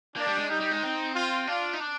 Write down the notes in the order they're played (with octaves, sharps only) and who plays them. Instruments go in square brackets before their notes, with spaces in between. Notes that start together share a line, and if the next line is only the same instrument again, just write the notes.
[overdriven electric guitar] A#3 [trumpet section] D4
[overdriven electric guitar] G3
G#3
[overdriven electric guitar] G3 [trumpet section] D#4
[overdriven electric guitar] G3
G#3
C4
[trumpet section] F4
[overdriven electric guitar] D4 [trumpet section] F4
[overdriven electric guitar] D#4
D4